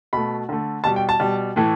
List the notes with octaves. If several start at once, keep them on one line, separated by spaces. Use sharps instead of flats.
B2 A3 B5
D3 A3
B2 G3 A5
G5
A5
B2 G3
A2 E3 A3